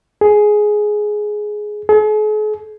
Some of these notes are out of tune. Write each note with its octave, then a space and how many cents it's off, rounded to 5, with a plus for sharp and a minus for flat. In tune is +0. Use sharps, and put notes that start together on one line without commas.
G#4 +10
G#4 +45